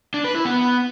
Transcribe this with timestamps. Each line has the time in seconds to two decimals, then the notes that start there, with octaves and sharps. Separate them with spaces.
0.14 D4
0.24 B4
0.35 E4
0.45 B3